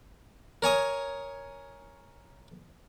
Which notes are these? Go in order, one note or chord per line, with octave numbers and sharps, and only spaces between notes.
A#4 C#5 G#5 D#6